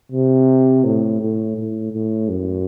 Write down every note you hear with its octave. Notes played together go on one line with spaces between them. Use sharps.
C3
A2
A2
A2
A2
F#2